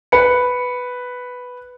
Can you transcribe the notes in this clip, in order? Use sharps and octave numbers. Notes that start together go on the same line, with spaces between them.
B4 C#7